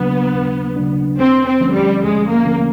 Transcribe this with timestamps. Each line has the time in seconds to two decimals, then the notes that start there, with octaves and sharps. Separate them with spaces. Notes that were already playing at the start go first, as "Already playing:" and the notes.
Already playing: D#2 C#3 F#3 A#3 B3 D4
0.34 D#2
0.76 C#3 F#3 A#3 D4
1.19 D#2 C4
1.47 C4
1.61 D3 F3 A3 C#4
1.75 G3
2.03 D#2 G#3
2.30 A#3
2.45 D3 F3 A3 C#4